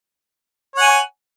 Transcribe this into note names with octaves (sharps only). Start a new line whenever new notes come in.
C#5 F#5 G#5